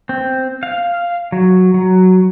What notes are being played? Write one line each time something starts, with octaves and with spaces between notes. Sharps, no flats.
C4
F5
F#3
F#3